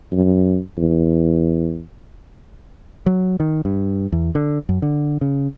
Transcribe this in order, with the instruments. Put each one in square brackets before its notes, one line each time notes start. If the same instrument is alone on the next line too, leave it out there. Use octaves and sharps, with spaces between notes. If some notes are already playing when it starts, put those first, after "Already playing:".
[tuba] F#2
E2
[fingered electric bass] F#3
D#3
G2
E2
D3
F#2
D3
C#3